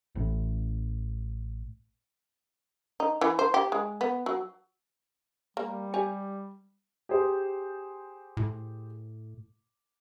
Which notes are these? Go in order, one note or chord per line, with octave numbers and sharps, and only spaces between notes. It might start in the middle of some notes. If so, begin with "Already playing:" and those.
A1 A2
D#4
E3
C5
G4
G#3
B3
F#3
G3 A#3
G4 C#5 G#5
G4 G#4 C5
A2